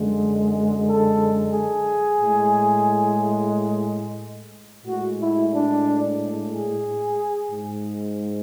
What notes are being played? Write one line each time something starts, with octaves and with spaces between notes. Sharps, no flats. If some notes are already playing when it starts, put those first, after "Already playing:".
Already playing: F#2 D3 G#3
A4
G#4
A2 G#3
A2 G#3 F#4
E4
D4
G#4
G#2 G#3